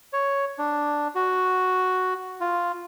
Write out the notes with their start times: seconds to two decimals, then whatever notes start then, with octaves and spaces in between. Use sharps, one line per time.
0.13 C#5
0.59 D4
1.15 F#4
2.41 F4